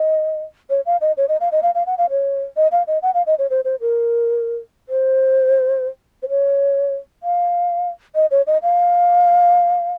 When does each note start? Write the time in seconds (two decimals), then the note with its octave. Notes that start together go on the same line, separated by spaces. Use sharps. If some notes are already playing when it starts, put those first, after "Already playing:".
Already playing: D#5
0.70 C#5
0.86 F5
1.01 D#5
1.17 C#5
1.29 D#5
1.40 F5
1.52 D#5
1.63 F5
1.75 F5
1.86 F#5
1.98 F5
2.10 C#5
2.56 D#5
2.72 F5
2.87 D#5
3.02 F#5
3.14 F5
3.26 D#5
3.39 C#5
3.50 C5
3.65 C5
3.81 A#4
4.89 C5
6.23 C5
6.29 C#5
7.23 F5
8.15 D#5
8.31 C#5
8.47 D#5
8.63 F5